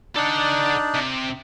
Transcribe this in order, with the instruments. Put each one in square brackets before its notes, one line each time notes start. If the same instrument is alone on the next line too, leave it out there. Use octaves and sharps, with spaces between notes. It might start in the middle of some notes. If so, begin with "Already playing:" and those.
[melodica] D4 D#4 D5 [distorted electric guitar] A4 F#5
[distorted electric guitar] C3